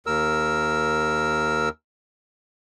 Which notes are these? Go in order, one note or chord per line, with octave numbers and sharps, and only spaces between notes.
D#2 A#4 E6